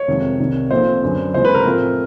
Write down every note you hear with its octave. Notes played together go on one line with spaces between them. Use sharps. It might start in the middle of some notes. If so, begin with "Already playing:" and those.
Already playing: C#5
F2 C3 D#3 G#3
C2 C3 D#3
A#2 F3 A3 C4 C5
F#2 D3 F#3 B3
C#2 C3 E3 G#3 C5
B4
A#4
A2 F3 A3 C4